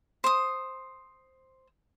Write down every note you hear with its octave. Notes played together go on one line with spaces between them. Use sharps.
C5 D#6